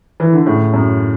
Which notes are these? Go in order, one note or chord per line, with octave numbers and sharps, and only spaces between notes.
E3
D3
A2 C#3
F#2